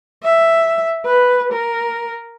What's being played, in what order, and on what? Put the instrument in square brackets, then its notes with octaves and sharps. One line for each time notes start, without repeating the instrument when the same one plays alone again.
[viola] E5
B4
A#4